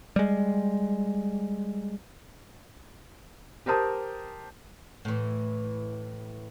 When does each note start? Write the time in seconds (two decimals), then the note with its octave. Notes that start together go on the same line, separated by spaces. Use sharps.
0.16 G3 G#3
3.66 G4 A#4 C5 A5 D#6
5.05 A2 E3